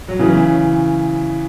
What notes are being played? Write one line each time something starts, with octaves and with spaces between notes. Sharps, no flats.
F#3
C#3 E3